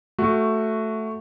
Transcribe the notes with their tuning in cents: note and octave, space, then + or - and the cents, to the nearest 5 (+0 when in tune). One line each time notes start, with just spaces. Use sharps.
A3 +0 F#4 +0